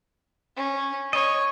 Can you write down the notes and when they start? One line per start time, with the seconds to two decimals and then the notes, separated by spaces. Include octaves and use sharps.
0.56 C#4
1.13 C#5 D#5